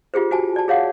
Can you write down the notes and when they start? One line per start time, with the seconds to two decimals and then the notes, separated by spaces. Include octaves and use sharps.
0.14 F4 G4 G#4 C5
0.31 F#4 C5 G#5 A5
0.56 D5 A5
0.68 G#4 C#5 F5 F#5